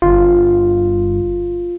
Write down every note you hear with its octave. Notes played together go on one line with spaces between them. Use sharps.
G1 F4